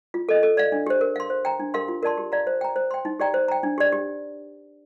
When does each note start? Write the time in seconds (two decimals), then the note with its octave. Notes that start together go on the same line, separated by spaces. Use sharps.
0.14 F4
0.29 A4 D#5
0.43 A4
0.57 D5 F5
0.72 D4
0.87 G4 C5
1.01 A#4
1.16 F5 C6
1.30 C5
1.45 G5 A#5
1.60 D4
1.74 G4 A#4 F5 C6
1.88 F4
2.03 A#4 D5 A5 C6
2.18 G4
2.32 D5 F5 A#5
2.47 C5
2.61 G5 A#5
2.76 C5
2.91 G5 C6
3.05 D#4
3.20 G4 D5 G5 A#5
3.34 C5
3.48 G5 A#5
3.63 D4
3.78 G4 D5
3.93 G4